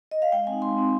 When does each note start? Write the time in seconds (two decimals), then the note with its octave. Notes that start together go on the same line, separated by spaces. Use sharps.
0.11 D#5
0.22 F5
0.32 G#3 G5
0.47 C4 G#5
0.53 D#4
0.62 G#3 C6
0.78 C4 D#4